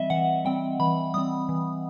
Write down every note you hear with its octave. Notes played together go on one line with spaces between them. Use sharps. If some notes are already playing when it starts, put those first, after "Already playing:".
Already playing: E3 G3 C4 D#5 E5
E3 F#5
G3 C4 G5
E3 B5
G3 C4 D#6
E3